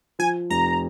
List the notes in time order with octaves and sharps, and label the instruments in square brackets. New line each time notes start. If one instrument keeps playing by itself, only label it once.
[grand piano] F3 [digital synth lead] G#5
[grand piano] F1 [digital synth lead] A#5